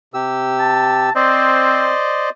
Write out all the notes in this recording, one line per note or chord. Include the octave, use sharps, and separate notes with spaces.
C3 G4 E6
A5
C4 C5 D5 D#5